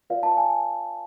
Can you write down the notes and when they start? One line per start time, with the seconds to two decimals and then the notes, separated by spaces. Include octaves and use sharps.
0.10 F4 B4 D5 F5
0.23 A5
0.37 G#5